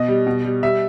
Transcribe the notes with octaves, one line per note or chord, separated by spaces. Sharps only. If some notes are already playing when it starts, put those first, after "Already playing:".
Already playing: B2 D#5
G3
B2
G3
G3 E5